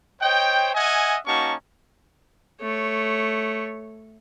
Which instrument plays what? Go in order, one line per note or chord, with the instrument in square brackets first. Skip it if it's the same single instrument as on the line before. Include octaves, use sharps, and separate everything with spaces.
[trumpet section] C5 C#5 D#5 G5
D#5 E5 F#5 G#5
A#3 C#4 D#4 F#4 A5 C#6
[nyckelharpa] A3 C#5